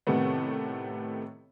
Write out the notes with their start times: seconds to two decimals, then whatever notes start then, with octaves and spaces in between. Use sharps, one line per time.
0.07 A2 C3 D#3 A3 B3